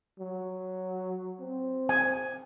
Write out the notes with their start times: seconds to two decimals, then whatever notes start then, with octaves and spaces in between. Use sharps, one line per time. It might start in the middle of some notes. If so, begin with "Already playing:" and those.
0.19 F#3
1.40 C4
1.89 G#5